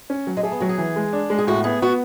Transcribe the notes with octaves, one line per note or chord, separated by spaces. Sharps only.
C#4
F#3
G#3
A3 G#4
B3
F#3 F#4
G#4
E3
G#3
D4
G#3
G#4
A2 F#4
B3 G#4
B3 F#4